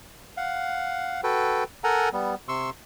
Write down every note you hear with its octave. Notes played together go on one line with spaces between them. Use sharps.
F5 F#5
F#4 A4 B4 G5
A4 A#4 F#5 G#5 A#5
G3 B3
C3 C6 C#6 E6